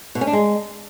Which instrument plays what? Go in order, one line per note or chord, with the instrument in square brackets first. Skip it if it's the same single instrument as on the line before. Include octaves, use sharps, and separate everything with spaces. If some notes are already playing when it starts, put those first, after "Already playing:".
[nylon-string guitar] B2
C#4
D4
G#3